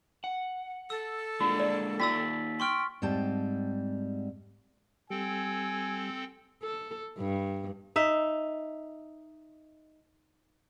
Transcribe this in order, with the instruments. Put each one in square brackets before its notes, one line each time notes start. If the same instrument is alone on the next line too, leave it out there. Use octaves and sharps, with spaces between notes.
[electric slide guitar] F#5
[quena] A4 [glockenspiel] E6
[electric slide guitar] G#3 A#3 D4 [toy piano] F4
[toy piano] D5 E5
[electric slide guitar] A#3 D#4 D5 [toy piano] F4 G5 [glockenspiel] E6 A6 B6
[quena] G5 [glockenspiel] C6 C#6 F6
[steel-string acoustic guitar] G#2 G3 C4 G5 A5
[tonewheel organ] G3 [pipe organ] C4 A4 G5 [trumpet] G#5
[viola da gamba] A4
G2
[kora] D#4 E5